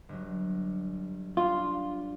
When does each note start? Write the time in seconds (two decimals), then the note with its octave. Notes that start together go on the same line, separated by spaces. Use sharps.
0.09 G1 F#3
1.37 D4 F4